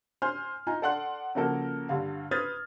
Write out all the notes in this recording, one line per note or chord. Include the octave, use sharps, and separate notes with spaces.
C5 G#5 C6 F6
D#4 F4 G#5 A#5
A4 D5 F#5 C6 F#6
C#3 F3 A#3 F#4 A4 A#4
G2 D3 F5
B4 C5 D#6 F6 G#6 A6